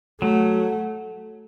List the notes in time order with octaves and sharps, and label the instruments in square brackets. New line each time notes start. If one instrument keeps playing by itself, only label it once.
[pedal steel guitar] F#3 [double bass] A3